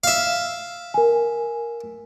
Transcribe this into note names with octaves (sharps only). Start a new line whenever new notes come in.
E5 F5
A#4 G#5